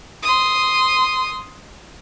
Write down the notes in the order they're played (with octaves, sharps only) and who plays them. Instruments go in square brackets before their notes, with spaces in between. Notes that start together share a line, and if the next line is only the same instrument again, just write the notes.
[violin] C6 D#6